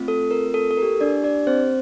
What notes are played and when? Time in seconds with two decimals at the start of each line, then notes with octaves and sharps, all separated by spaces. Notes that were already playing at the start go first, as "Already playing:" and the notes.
Already playing: A3 C4 F4
0.08 A4
0.31 A#4
0.54 A4
0.71 A4
0.77 A#3 E4 G4 A#4
1.01 D4 D5
1.24 D4 D5
1.47 C4 C5